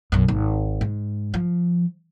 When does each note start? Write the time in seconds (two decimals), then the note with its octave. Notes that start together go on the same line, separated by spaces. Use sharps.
0.12 B1 F#2
0.28 G#1
0.81 G#2
1.34 F3